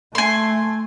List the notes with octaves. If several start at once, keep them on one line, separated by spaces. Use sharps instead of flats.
A3 G#5 C6